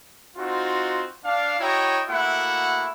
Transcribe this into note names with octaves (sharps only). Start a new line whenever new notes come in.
C4 D#4 F4 F#4
D4 F5
E4 F#4 C#5 D#5 G5 A#5
A3 A#3 E4 F#4 F#5